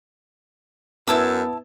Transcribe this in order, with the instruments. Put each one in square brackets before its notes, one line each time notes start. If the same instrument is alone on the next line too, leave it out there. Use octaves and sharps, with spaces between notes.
[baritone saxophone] F#2 [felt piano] B3 [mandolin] E4 A5 E6